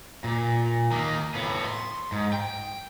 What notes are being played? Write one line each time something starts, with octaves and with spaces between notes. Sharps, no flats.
A#2
D#3 A#3
A2 B3
C6
G#2
G5